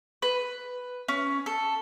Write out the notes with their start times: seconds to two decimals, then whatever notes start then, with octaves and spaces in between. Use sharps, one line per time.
0.22 B4
1.08 C#4
1.46 A4